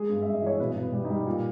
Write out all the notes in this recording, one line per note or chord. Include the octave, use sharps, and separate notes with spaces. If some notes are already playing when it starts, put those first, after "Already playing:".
Already playing: G#3 G#4
G2
G2 E5
D#5
E3 C#5
B2 B4
B2
B4
G3
D#4
G3
A#2